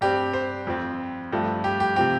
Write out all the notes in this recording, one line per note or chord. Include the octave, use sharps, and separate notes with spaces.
G2 G3 C4 G4
C5
F2 F3 C4
G2 F3 A3 C4
G4
G4
C3 F3 C4 G4